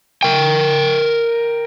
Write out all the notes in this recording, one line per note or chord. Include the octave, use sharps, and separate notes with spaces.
A#4 G5